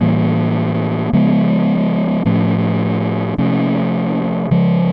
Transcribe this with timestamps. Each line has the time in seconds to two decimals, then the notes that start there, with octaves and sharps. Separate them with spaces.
0.01 A2 E3 G3 A#3
1.13 C#3 F3 G#3 B3
2.25 A2 F3 A3 C#4
3.38 C3 F3 A3 C#4
4.51 C#3 F3 G#3